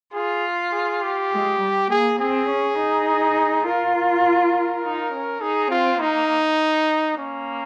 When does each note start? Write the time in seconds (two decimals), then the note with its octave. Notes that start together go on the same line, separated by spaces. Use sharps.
0.13 F4 G#4
0.72 G#4
1.02 G4
1.31 G#3
1.60 G3
1.89 A#3 G#4
2.19 C4 G#4
2.48 C#4
2.78 D#4
3.65 F4 A#4
3.95 A#4
4.83 D#4
5.12 C#4
5.41 D#4 G#4
5.70 C4 F4
6.00 A#3 D#4
7.17 A#3 C#4